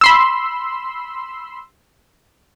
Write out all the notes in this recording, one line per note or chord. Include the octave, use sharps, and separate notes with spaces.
B5 C6 E6